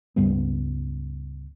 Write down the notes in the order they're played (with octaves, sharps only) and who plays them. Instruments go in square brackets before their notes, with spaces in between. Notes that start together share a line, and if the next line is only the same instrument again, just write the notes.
[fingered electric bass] C#2 G2 G3 B3